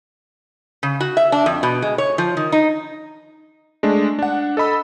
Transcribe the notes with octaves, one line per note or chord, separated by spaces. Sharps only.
C#3
F#4
E5
D4
F2
B2
G#3
C#5
F3
D#3
D#4
G#3 A3 D4
D4 F#5
A4 D#5 B5 E6